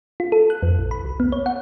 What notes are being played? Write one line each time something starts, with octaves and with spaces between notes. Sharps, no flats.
F4
A4
F#6
F2
A#1
B5
C2
B3
C#5
F#5